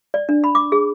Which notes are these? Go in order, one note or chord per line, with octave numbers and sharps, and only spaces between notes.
D5
D4
B5
D6
G#4